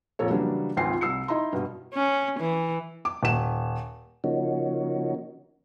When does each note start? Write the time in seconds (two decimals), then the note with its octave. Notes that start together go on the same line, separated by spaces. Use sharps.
0.19 A#1 F2 A#3 A4 C#5
0.31 C#3 E3 F#3 G3 A#3 D4
0.77 G#1 C#2 F4 G5 G#5 C7
1.01 C2 E6 C7 C#7
1.28 D#4 E4 D#5 E5 A#5 C6
1.53 G2 B2
1.94 C#4
2.40 E3
3.05 D6
3.23 D#1 E7
4.24 C#3 F3 A#3 C#4 D#4 F#4